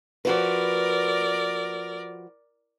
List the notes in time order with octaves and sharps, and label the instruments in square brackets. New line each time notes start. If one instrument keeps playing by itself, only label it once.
[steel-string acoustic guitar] F3 F#4 B4 [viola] A#4 D5